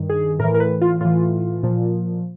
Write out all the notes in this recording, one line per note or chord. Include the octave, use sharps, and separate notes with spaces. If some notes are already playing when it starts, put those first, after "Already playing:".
Already playing: G2 D#3
G#4
A2 E3 A#4
A#4
B4
F4
A2 E3 F4
A#2 F3